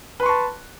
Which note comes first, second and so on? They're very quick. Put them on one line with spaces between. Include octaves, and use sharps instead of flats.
B4 C6 C#6 A5